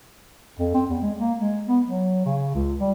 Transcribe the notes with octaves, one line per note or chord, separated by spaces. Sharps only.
F2
C4
E2
G#3
A#3
G#3
B3
F#3
C#3
C#2
G3